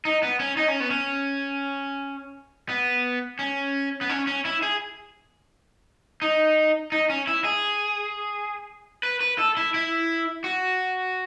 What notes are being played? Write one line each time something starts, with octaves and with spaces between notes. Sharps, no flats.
D#4
B3
C#4
D#4
C#4
B3
C#4
B3
C#4
B3
C#4
C#4
E4
G#4
D#4
D#4
C#4
E4
G#4
B4
B4
A4
E4
E4
F#4